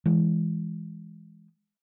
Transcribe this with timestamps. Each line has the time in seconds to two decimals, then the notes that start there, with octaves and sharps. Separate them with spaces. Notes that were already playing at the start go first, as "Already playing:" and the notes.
0.06 E3 G#3